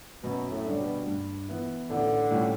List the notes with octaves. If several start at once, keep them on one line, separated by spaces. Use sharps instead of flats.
F#2 B2
A2
D3 G3 D4
B2
G2
E3 B3 E4
A1 D3
A2 G3 C#4